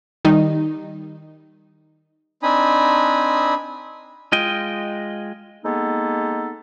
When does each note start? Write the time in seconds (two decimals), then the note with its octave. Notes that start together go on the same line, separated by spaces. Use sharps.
0.25 D#3 G3 D#4
2.43 C4 D4 D#4 G#5 B5 D#6
4.32 G#3 F4 D#5 G5
5.65 G#3 A#3 B3 D#4 A4